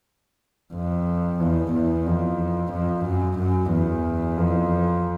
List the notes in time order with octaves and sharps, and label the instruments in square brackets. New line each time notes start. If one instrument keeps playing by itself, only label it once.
[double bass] F2
E2
E2
F2
F2
F#2
F#2
E2
F2